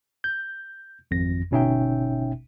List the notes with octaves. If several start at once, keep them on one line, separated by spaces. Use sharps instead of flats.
G6
G#1 F2 A#6
G1 B2 C#4 D#4 E5 G5